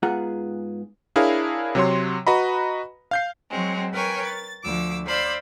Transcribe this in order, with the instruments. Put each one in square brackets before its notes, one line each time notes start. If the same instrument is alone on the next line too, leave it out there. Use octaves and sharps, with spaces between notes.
[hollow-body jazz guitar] G#2 B3 F4 G#4 F#5 A#5
[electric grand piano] D4 E4 G#4 A#4 C#5 F5
C3 F#3 C#5 C6
F#4 B4 D#5 A#5 B5
F5 G6 C7
[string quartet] F#3 G#3 C4
A#4 B4 C#5 G5 G#5
A6
D2 F3 D6 E6
C5 D5 F5 B5 E6